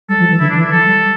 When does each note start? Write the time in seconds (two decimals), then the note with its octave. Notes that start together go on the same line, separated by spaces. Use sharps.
0.09 G3 A4
0.19 F3
0.30 E3
0.40 D3 E4
0.50 D4
0.55 E3
0.60 E4
0.71 F3 A4
0.86 G3